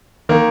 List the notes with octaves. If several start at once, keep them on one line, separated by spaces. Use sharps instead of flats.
D#3 A#3